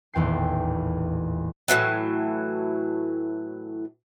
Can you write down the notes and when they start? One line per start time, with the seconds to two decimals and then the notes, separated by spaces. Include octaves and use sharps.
0.14 D#1 A1 E2 G5 C7
1.68 A2 C3 E3 F#3